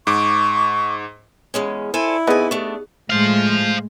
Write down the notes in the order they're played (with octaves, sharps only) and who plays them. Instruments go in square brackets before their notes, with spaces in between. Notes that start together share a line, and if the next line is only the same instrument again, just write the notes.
[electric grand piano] G#2 D6 [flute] C#6
[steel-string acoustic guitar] E2 G#3 C#4
[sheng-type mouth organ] E4 [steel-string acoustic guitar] A4 C5 G#5
[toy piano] D5
[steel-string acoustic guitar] F2 G#5 [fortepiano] B3 B4 D#5 [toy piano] D#4 G#4 D5
[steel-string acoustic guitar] A3 D4 [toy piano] G4
[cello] A2 G#3 [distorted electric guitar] C5 F5